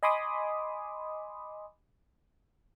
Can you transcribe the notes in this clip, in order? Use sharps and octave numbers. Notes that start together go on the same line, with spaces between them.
D#5 G#5 B5 C6 D6 D#6